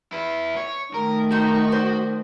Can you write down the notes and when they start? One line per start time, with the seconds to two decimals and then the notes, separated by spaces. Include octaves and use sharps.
0.13 B3 E4
0.57 C#5
0.94 D#3 A3 A#4
1.31 C4 D#4 F#4 G4
1.72 C5 D5